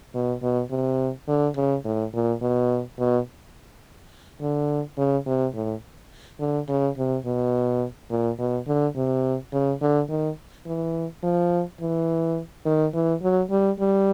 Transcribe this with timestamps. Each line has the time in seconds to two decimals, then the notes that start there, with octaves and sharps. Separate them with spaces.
0.15 B2
0.42 B2
0.71 C3
1.28 D3
1.56 C#3
1.85 A2
2.14 A#2
2.42 B2
2.99 B2
4.41 D3
4.98 C#3
5.26 C3
5.54 A2
6.39 D3
6.69 C#3
6.97 C3
7.26 B2
8.10 A#2
8.39 B2
8.67 D3
8.96 C3
9.53 C#3
9.82 D3
10.10 D#3
10.66 E3
11.23 F3
11.81 E3
12.66 D#3
12.94 E3
13.22 F#3
13.51 G3
13.80 G3